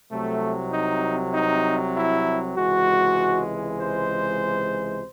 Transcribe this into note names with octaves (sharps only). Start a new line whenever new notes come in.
C2 C3 F#3 A3
D#4
D#4
E4
C#2 C3 E3 G#3 F#4
C5